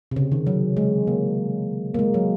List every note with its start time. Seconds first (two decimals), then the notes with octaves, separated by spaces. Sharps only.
0.11 C3
0.16 C#3
0.32 D#3
0.47 F#3
0.77 G#3
1.07 A#3
1.94 A#3
1.99 G#3
2.14 F#3